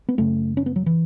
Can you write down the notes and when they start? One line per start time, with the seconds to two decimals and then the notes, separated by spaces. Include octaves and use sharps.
0.09 B3
0.18 F#2 C#3 A3
0.57 C#4
0.66 B3
0.76 F#3
0.86 E3